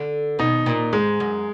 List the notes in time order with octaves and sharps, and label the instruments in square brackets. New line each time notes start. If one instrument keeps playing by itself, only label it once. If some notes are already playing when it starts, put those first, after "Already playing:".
Already playing: [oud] D3
[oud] B2 [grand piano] D#4
[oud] A#2
[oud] G#2 [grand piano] G#3
[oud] F#2